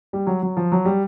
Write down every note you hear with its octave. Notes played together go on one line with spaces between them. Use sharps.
G3
F#3
F#3
F3
F#3
G3